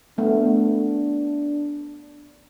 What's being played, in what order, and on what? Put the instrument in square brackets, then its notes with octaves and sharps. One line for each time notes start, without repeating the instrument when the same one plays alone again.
[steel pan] A3 B3 [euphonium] D4